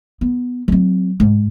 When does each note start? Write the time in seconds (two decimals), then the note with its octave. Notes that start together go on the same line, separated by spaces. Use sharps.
0.21 B3
0.68 F#3 C4
1.20 G#2